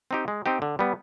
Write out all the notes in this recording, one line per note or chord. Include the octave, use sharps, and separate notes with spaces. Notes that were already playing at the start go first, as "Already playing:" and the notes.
C4 D#4 G4
G#3
C4 D#4 G4
D3
G3 B3